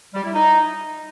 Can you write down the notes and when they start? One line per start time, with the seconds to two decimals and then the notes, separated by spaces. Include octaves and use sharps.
0.15 G3
0.24 E4
0.34 D#4